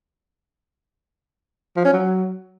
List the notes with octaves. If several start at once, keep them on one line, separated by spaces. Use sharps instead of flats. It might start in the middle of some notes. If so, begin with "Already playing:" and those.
F3
C#4
F#3